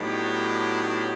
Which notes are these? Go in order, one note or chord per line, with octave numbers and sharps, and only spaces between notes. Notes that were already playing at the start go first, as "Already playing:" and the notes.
Already playing: A2 F#3 B3 D4 D#4 G4